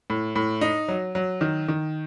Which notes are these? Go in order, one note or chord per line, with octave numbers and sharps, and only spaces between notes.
A2
A2
D#4
F#3
F#3
D#3
D#3